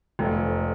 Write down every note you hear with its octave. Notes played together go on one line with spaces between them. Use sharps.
F1 F2